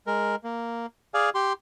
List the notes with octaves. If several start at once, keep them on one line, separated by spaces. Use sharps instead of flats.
G#3 A#4
A#3
G#4 D5 F5 G#5
G4 C6